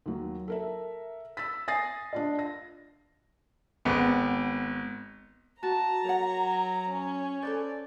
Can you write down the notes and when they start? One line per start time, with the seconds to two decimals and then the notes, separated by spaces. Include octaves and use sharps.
0.06 D#2 F#3
0.48 A4 A#4 E5
1.37 E6 A6 B6
1.68 G#5 D#6 A6 A#6 C7
2.13 D4 F4 D#5
2.39 A#6
3.85 G#1 B3
5.63 F#4 A5 A#5
6.05 F#3 A#4 C#5 F#5
6.89 C#4
7.42 A4 B4 C5 D5